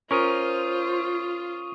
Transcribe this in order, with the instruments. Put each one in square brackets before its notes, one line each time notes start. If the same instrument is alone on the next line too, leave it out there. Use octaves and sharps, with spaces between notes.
[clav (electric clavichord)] C#4 A#4 [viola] F4 [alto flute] C5 [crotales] C#6 D#6 D#7